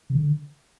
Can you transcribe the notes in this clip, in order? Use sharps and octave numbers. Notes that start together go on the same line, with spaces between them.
C#3
D3